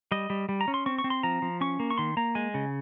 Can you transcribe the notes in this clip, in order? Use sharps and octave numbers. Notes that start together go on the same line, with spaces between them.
G3 D#5
G3
G3
A#5
C#4
C6
C4 C#6
C#6
C4
C6
F3 A#5
F3
C#4 C#6
A#3
C#6
D#3 C6
A#3 A#5
G#3 G#5
C#3